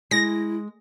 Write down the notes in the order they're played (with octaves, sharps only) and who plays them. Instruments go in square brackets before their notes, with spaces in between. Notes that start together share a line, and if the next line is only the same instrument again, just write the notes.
[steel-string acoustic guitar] G#3 [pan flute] E4 [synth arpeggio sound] A#6